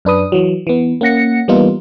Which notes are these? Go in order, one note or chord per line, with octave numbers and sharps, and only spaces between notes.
F#2 D4 B4 D#6
E3 F#3
E3 B3
A#3 C#4 F#5 A#6 C#7
E3 G3 A#3 B3 D#4 F4